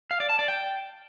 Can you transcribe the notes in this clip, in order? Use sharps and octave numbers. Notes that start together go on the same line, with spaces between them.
F5
D5
A5
D5
G5